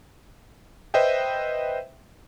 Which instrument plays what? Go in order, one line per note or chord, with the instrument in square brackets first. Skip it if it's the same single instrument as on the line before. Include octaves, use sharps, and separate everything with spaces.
[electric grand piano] B4 C5 D#5 E5 G5